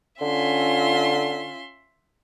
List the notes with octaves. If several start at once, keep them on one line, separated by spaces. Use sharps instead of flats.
D3 C#4 F4 E5 C6